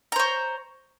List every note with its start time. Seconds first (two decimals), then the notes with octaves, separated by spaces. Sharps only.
0.12 A#5
0.16 C5
0.20 C#5